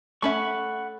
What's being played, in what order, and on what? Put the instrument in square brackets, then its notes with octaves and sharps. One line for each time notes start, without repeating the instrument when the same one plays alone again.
[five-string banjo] A3 C#4 E5 [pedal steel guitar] F#5 B5 C#6